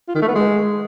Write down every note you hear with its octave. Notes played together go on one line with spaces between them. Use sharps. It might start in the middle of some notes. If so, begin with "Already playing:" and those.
F4
D#3
A3
B3
G#3